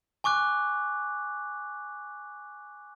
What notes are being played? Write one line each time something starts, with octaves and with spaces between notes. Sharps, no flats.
G#5 C#6 D6 F#6